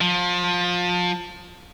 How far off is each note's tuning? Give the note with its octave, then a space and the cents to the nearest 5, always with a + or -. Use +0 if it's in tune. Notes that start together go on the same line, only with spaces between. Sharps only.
F3 +25